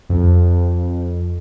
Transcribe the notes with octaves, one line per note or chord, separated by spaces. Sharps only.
F2